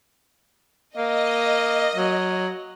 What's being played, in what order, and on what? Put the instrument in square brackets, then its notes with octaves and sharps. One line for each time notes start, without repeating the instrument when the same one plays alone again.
[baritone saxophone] A#3 [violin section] D#5
[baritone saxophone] F#3